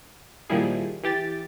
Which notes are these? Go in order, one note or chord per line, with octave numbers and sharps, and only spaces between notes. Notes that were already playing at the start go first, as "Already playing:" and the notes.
A#2 D#3 F3 G3 E4 G#4
E3 G4 A6